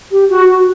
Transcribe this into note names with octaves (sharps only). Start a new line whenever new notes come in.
G4
F#4
F#4